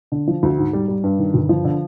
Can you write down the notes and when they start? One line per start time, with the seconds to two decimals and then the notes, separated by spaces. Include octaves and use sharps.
0.12 D3
0.27 F3
0.43 D2
0.58 G#2
0.73 G3
0.88 G3
1.04 G2
1.19 D#3
1.34 G1
1.49 F3
1.65 D3